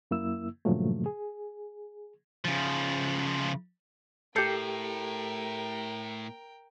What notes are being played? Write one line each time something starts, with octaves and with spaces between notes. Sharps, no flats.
F#2 A#3 E4 E6
G2 A#2 C#3 F3 F#3 A3
G#4
C#3 F3
A2 G4 A4 A#4 G5 G6 C7 C#7